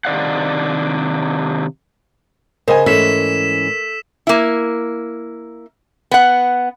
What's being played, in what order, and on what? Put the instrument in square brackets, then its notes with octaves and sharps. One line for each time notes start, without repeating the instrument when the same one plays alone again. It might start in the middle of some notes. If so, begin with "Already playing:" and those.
[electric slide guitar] C3 D#3 D4 D5 F5 F#5
[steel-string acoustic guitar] C#3 [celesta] A#4 [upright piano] C5 D#5 G#5
[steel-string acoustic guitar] G#2 E3 C#4 [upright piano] A3 [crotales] E6 B6 E7
[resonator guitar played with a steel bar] A#3 E4
B3 F#5